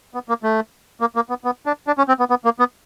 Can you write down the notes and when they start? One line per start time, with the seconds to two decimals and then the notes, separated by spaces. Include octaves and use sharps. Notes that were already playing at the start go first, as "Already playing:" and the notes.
0.14 B3
0.29 A#3
0.43 A3
1.01 A#3
1.16 A#3
1.29 B3
1.44 B3
1.66 D4
1.87 D4
1.98 C#4
2.08 C4
2.19 B3
2.30 B3
2.45 A#3
2.59 B3